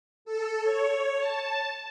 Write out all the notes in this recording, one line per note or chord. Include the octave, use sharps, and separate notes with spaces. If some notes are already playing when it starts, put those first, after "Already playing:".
A4
C#5
A5